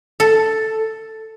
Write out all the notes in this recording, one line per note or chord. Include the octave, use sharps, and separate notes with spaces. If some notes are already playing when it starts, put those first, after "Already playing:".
A4